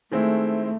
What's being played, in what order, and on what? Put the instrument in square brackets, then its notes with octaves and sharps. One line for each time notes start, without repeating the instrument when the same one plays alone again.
[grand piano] D#3 G#3 C4 E4 [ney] A3